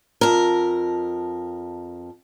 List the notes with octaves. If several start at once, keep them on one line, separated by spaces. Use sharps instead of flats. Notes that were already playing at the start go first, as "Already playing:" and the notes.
F2 A#4